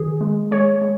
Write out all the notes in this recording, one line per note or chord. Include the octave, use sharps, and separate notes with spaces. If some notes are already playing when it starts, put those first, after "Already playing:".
Already playing: D#3 G#4
G#3
G#3 C#5
G#3